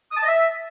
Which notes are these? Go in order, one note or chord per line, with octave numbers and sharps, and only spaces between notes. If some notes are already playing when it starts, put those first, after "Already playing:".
D#6
A5
D#5
E5